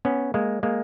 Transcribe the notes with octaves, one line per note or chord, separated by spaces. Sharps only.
B3 C#4
G#3 A#3
G#3 A#3